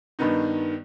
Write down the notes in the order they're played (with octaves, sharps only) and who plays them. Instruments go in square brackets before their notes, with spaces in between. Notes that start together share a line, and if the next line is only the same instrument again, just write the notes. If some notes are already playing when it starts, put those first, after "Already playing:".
[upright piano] G2 D#3 B3 D#4